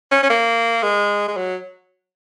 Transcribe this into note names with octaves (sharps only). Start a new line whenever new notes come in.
C#4
C#4
A#3
G#3
G#3
F#3